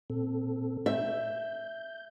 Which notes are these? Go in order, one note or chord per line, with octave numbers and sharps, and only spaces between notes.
A#2 C4 A4
E5 G6